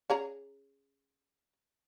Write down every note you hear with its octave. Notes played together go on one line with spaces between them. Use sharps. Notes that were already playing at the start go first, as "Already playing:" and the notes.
C#4 G#4 A#5